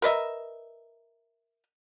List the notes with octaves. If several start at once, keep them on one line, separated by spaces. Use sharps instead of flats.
A#4 B4 D#5 E5